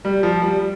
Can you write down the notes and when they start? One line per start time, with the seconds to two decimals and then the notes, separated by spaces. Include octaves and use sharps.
0.05 G3
0.23 F3
0.42 G3